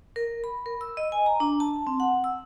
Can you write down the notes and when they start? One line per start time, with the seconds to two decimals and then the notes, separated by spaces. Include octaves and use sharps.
0.16 A#4
0.44 B5
0.66 A#4
0.81 E6
0.97 D#5
1.12 G#5
1.26 A#5
1.40 D4
1.60 A5
1.87 C4
2.00 F#5
2.24 E6